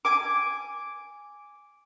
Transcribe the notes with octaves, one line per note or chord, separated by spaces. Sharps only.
G#5 D6